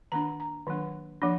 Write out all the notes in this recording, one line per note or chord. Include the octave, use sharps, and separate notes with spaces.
D#3 A#3 D4 A#5
A#5
D#3 F#3 A#3 D4
F3 A#3 D4